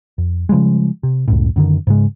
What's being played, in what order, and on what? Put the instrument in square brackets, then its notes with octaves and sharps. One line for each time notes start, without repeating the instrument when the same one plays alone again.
[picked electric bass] F2
C#3 F3 G3 G#3
C3
C#2 F#2 A2
F#2 D3 D#3
G#2 C#3 G#3